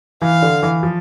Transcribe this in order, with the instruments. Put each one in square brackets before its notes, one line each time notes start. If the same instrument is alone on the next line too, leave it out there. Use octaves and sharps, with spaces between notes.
[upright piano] E3 [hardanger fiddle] F5
[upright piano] D3
E3
F3